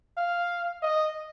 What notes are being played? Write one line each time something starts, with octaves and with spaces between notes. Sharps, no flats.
F5
D#5